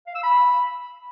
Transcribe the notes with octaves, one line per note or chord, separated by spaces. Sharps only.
F5
E6
B5